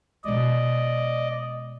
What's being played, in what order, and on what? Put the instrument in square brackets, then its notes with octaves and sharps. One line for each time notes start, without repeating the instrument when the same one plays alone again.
[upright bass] B2 G#3 [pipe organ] D5 D#5